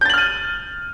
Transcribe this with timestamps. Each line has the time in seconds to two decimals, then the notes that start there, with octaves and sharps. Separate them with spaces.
0.01 G6
0.05 A6
0.10 F#7
0.14 F6
0.18 D#7